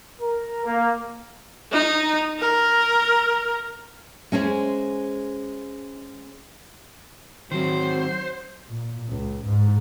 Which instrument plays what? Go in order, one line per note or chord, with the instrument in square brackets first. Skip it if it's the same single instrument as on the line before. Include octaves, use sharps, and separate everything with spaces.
[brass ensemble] A#4
A#3
[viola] D#4
A#4
[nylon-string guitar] G#3 C#4 G#4 C5
[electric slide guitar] D#3 C4 [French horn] F#3 [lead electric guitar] C5
[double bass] A#2
C#2
G#2